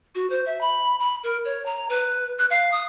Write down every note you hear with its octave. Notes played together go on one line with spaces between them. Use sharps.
F#4
C5
E5
B5
B5
A#4
C#5
A#5
B4
F#6
F5
D#6